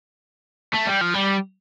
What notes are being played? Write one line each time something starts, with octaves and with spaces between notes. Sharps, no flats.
A3
G3
F3
G3